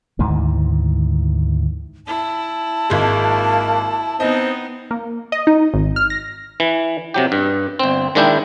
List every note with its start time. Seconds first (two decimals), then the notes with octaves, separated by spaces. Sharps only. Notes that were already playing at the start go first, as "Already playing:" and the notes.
0.19 D2 G#2 D#3 E3
2.07 E4 A5
2.90 G#1 G#3 A#3
4.20 B3 C4 D#4 D#5
4.91 A#3
5.32 D#5
5.47 D#4
5.74 G#1
5.96 F6
6.10 A#6
6.60 E3
7.14 C3 F#3 G4
7.32 G2
7.79 G1 C4
8.15 D#3 G#3 A#3 D4 E4 G5